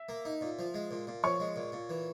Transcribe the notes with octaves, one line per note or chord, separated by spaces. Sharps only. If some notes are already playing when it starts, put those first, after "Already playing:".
Already playing: E5
A#3
D#4
A#2
F3
G#3
A#2
A#2
F3 C#5 C#6
G#3
A#2
A#2
E3